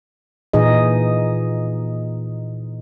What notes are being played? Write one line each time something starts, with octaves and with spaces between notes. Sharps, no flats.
A#2 E3 D#4 G#4 D#5